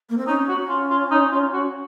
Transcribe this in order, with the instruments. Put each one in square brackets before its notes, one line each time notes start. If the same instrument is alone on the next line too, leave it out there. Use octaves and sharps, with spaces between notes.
[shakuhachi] A#3
C4
[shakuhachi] C#4 [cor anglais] D#4
[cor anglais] F#4
F4
F4
D#4
F4
F#4